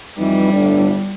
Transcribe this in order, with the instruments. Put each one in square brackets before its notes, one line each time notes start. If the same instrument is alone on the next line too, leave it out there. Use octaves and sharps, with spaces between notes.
[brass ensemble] F2 E3 D#4 [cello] G3
[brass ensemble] G1 A2 D4